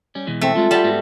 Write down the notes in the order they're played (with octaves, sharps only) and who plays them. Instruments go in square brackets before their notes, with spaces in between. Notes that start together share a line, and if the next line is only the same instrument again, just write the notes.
[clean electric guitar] G3 C#4
B2 E3 G#3
[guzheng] A3 [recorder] C4
[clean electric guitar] G3 G#3 C4 [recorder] F4
[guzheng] G3 A5 [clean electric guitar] A4 E5 F#5
[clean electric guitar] G#2 B3 F#4